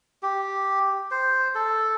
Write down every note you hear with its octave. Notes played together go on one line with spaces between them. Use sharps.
G4
C5
A4